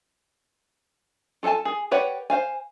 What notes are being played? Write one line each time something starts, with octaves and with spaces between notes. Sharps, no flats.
F4 A4 E5 G#5 A5
G#4
G4 B4 C#5 D5 F#5
C5 F5 G#5